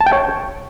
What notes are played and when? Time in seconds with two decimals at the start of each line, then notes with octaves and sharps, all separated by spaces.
0.01 A5
0.06 G5
0.12 C#5